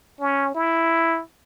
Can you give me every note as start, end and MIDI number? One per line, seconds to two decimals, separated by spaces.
0.21 0.51 61
0.55 1.21 64